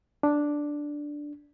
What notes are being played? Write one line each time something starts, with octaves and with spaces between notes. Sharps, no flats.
D4